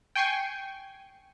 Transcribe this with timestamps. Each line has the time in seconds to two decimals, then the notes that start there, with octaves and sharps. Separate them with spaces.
0.15 G5 G#5 C#6 C7 D#7